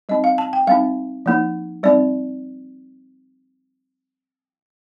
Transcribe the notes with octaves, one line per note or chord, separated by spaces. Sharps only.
G3 C4 D#4 D#5
F5
A5
G5
G3 C4 D#4 F5
F3 A#3 D#4
G3 C4 D#4 D5